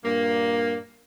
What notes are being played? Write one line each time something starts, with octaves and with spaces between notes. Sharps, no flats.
G2 A#2 A#3